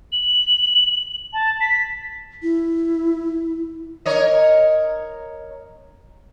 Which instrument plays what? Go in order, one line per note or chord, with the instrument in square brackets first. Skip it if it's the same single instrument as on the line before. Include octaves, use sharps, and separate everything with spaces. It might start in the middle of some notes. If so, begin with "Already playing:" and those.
[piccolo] F#7
A5
B6
[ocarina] E4
[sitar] A#4 C#5 D#5